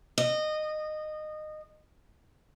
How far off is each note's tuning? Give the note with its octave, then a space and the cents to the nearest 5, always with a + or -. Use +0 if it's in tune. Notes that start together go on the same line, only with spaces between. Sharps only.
D#5 -20